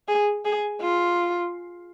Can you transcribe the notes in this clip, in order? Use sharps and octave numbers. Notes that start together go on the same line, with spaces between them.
G#4
G#4
F4